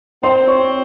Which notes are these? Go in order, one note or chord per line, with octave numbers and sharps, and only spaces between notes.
C4 C5 C6
C#5 C#6